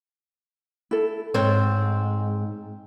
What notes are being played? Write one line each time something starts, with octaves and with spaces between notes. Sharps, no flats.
E4 A4
G#2 C4 C#5